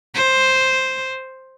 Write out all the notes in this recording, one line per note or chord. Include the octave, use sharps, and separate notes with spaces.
C5